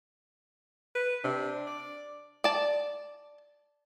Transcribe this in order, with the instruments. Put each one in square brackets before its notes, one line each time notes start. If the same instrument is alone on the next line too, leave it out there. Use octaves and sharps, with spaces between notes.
[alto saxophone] B4
[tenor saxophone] C3 [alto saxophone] D4
[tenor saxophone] D5
[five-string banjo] D5 A5